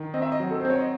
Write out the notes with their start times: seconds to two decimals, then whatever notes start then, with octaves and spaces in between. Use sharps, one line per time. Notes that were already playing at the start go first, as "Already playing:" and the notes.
Already playing: D#3
0.14 C4 D#5
0.22 E5
0.32 D#5
0.40 F#3
0.51 A4
0.60 C4 C5
0.70 C#5
0.80 D#5